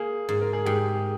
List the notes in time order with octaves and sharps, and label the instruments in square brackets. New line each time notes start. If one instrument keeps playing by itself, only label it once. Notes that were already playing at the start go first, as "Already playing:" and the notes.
Already playing: [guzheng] A#3 [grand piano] G#4
[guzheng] G#2
[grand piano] A#4
G#4
[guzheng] G#2 [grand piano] G4
[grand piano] G#4